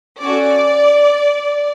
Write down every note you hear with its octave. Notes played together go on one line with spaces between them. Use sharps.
C#4 F#4 A4 D5